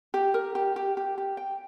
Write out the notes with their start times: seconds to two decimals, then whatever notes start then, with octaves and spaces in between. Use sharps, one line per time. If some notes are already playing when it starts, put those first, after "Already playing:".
0.14 G4
0.34 A#4
0.55 G4
0.76 G4
0.97 G4
1.18 G4
1.37 G5